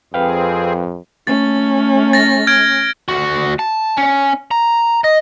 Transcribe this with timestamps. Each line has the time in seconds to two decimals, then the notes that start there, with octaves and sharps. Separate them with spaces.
0.14 F2 C4 G#4 B4 F5 G5
1.27 A3 C#4 A6
2.13 A6 A#6
2.47 F6 G#6 D7
3.09 D2 F#4
3.59 A5
3.97 C#4
4.51 A#5
5.04 D#5